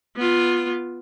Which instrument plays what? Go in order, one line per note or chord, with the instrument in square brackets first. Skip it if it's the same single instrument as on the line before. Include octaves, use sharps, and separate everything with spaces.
[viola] B3 F4